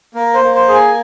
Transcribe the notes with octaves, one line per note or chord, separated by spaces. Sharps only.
A#3 A#4
C5
A#3
C5
G#4
G#5